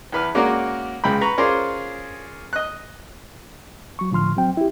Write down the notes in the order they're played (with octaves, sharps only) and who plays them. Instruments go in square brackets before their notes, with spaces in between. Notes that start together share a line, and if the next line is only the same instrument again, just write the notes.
[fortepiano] E2 B4 F6
G#3 A#3 C#4 F#4 A#4 D5
C#2 G#3 G5 B5
B4 A#5 C#6
C#4 F4 G#4 A#4 C5 D5
D#5 F#6
[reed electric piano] F#3 C#6
A2 D3 F3 C6 F6
F#3 C4 G5
E4 G4